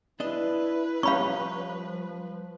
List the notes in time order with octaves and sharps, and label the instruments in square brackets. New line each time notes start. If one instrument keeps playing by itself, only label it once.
[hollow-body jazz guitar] D4 D#5 [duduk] E4 [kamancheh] B4
[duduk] F3 [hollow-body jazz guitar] G3 C#4 [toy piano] F5 B5 C#6